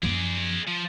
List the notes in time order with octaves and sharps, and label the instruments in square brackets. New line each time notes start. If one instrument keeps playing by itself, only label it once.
[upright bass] F#2 F3 [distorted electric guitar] G#4 D5
[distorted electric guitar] F3